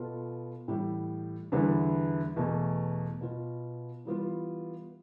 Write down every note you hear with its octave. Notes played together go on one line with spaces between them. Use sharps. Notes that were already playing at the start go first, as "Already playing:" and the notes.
Already playing: B2 B3 F4 A4
A2 E3 G3
E2 D3 G3 B3 E4
E2 B2 A3
B2 B3 F4
E3 G3 B3 F4